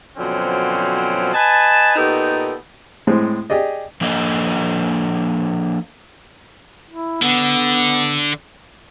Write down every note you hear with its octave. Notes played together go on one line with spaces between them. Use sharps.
B2 D3 F3 F#3 C4 C#4
B4 D#5 G#5 A5
A#2 B3 D#4 G4 A4
A2 G#3 C4
G4 G#4 D5 D#5
F3 A#3 D4 A4 D#5
E4
D3 B3